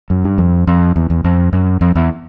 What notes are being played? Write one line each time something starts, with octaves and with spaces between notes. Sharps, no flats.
F#2
G2
F2
F2
E2
E2
F2
F#2
F2
E2